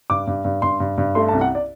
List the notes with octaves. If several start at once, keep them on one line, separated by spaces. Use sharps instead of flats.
G2 D6
G2
G2
G2 C6
G2
G2
A3 C6
A5
C2
F#5
D5